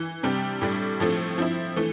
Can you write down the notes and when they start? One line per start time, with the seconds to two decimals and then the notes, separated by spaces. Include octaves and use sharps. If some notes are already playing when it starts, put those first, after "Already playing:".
Already playing: E3
0.23 C3 G3 D4 G4
0.62 A2 G3 D4
1.00 A2 F3 A3 C4
1.38 F3 C4 E4
1.76 E3 A3